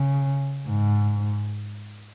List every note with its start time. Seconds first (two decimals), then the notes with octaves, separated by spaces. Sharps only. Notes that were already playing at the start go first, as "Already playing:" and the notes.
Already playing: C#3
0.68 G#2